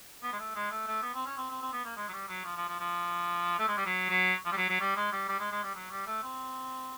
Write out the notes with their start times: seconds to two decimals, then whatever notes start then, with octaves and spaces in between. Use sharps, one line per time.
0.23 B3
0.33 G#3
0.39 A3
0.55 G#3
0.71 A3
0.87 A3
1.02 B3
1.14 C4
1.26 C#4
1.37 C4
1.50 C4
1.62 C4
1.73 B3
1.85 A#3
1.97 G#3
2.08 F#3
2.13 G3
2.28 F#3
2.45 F3
2.56 F3
2.68 F3
2.79 F3
3.59 A3
3.68 G#3
3.77 G3
3.86 F#3
4.09 F#3
4.45 F3
4.52 G3
4.57 F#3
4.69 F#3
4.81 G3
4.97 G#3
5.12 G3
5.28 G3
5.39 G#3
5.52 G#3
5.63 G3
5.75 F#3
5.91 G3
6.07 A3
6.23 C4